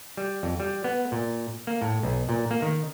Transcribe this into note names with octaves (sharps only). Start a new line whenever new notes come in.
G3
F2
G3
B3
A#2
A#3
A2
B1
A#2
A#3
D#3